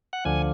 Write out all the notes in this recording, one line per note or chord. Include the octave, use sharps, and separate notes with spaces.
F#5
D2 D3 F3 G#5